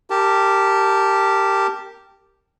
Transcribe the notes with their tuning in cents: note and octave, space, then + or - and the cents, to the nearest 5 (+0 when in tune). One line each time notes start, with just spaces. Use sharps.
G4 +0 A#4 -15 A5 +0